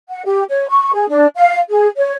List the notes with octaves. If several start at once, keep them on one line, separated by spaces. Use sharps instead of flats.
F#5
G4
C#5
C#6
G#4
D4
F5
G#4
C#5